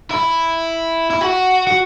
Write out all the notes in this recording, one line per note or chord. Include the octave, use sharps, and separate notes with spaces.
E4
E4
F#4
F#4